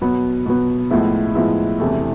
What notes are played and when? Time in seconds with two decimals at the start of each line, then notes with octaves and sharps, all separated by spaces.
0.01 B2 F#3 B3
0.46 B2 F#3 B3
0.91 A2 F3 G#3 B3 E4
1.35 A2 F3 G#3 B3 E4
1.79 E1 E2 C3 E3 A3